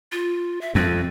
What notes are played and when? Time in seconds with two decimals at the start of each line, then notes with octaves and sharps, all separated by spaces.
0.12 F4
0.61 E5
0.75 F2 C4